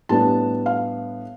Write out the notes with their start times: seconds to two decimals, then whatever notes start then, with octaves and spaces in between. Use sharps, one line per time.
0.09 A2 G3 B3 D4 A5
0.66 F5